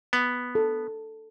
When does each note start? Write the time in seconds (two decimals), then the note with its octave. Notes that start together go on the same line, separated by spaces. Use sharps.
0.13 B3
0.55 A4